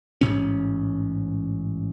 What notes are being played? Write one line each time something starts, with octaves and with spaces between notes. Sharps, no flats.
A1 G#2 C3 C#4